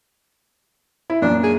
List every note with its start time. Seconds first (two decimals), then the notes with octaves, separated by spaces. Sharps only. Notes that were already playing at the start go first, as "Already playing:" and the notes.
1.10 E4
1.22 F#2 A#2 D4
1.44 G#4